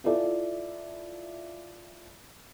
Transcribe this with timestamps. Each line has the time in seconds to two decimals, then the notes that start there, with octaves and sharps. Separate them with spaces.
0.04 E4 F4 A4 D5 E5